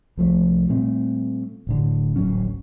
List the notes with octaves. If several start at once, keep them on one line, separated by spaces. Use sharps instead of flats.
C2 F3 A3
A#2 G3 A3 C4
D1 A2 D3
D1 A1 F#3 C#4